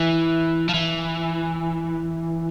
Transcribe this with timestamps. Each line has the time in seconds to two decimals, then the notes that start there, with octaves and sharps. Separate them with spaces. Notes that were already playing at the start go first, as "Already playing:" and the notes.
Already playing: E3
0.69 F3
0.74 E3